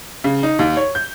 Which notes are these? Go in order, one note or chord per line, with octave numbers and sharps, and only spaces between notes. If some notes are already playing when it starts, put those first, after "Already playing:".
C#3
D#4
D#2
C#5
G6